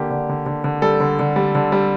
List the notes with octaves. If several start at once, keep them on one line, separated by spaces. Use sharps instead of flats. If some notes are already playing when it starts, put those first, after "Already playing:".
Already playing: D3 A#3 G4
D3
D3
D3
D3
G3 A4
D3
D3
G3
D3
G3